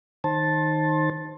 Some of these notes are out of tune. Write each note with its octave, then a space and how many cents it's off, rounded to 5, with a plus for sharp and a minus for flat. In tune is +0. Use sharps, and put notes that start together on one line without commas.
D#3 -10 C5 +25 A5 +0